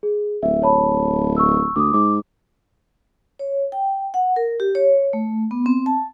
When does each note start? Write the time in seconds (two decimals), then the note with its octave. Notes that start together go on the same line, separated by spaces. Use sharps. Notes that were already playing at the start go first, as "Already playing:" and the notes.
0.03 G#4
0.43 D1 E5
0.63 C#5 A5 B5
1.37 C#6 E6
1.76 D2 D6 D#6
1.94 G#2 D6
3.39 C#5
3.72 G5
4.14 F#5
4.36 A#4
4.60 G4
4.75 C#5
5.13 A3
5.51 B3
5.66 C4
5.86 A5